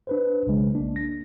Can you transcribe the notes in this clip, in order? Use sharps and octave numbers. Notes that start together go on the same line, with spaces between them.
D4 B4 C5
B1 C#3 G#3
A#3 D4
A#6